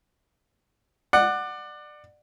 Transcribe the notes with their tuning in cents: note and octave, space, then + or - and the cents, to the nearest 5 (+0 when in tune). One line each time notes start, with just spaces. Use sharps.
D5 +25 F#5 +0